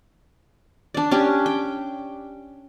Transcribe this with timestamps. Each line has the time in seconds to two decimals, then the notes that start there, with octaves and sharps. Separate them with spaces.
0.94 D4 D5
1.11 C#4 D4 G4
1.46 G5